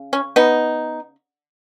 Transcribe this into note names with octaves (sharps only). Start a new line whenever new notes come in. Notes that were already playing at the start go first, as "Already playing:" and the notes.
Already playing: C#3
C#4
B3 D#4